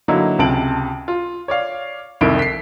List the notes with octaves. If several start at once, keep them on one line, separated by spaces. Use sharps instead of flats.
D3 F#3 A#3 D#4 E4
C#2 C3 A5 D7 F#7
F4
C#5 D5 F5
C2 F2 D#3 E4 D7
B6 C7